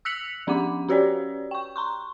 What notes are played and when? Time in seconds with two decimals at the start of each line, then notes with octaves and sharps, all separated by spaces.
0.05 E6 F#6 B6 C#7 F7 F#7
0.47 F3 C#4 D4 F#5 D6
0.89 C#4 F#4 G4 B4 C#5 D5
1.51 G5 C#6
1.76 A#5 C6 C#6